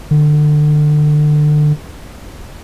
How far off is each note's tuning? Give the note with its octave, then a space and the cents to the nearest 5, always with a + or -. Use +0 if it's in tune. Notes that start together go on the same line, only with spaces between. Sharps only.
D3 +30